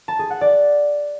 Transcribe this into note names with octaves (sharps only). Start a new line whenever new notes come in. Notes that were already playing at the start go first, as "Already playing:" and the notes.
A5
G#4
F#5
D5